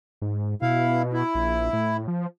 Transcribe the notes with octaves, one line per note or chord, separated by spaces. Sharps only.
G#2
B2 E4 F5
E4
A#1
A2
F3